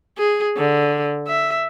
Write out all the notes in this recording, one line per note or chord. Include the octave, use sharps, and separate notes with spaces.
G#4
D3
E5